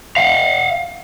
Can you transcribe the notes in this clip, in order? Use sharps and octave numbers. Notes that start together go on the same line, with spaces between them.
F5 F#5